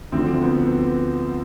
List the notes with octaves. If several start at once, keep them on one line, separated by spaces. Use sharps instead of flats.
D2 D3 F3 C4
B3